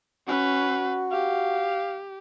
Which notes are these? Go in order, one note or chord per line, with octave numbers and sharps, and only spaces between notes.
C#4 F#4 B4
G4 F5